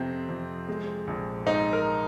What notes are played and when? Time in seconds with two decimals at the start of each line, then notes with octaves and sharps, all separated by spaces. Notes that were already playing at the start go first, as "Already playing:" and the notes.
Already playing: F2 C3 F3 C4
0.29 F2
0.69 G#3
1.07 A#1
1.46 G#2 D#4
1.73 A#4